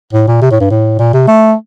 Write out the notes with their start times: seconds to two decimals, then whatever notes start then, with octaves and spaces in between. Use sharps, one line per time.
0.13 A2
0.27 A#2
0.42 C3
0.51 A2
0.60 G2
0.70 A2
0.99 A#2
1.13 C3
1.28 A3